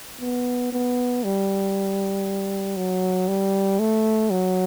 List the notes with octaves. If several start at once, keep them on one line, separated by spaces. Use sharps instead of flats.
B3
B3
G3
F#3
G3
A3
F#3